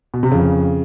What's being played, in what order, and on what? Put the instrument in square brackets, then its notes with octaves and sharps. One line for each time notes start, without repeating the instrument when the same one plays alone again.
[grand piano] B2
C3
[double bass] F2 [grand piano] C#3